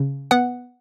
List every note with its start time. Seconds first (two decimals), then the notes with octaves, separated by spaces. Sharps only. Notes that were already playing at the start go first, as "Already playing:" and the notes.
Already playing: C#3
0.31 B3 F#5